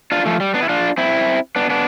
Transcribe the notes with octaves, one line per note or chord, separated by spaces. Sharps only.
D4 F4
F3 A3
G3
B3 D4
E4
D4 F4
C4 E4
B3 D4
B3 D4